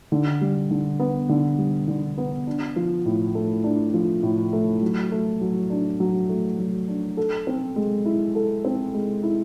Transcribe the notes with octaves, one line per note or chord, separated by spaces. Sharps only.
D3
G3
D3
B3
D3
G3
D3
B3
D4
F3
A2
A3
D4
F3
A2
A3
F#3
A3
F#3
D4
F#3
A3
F#3
D4
A4
C4
G#3
E4
A4
C4
G#3
E4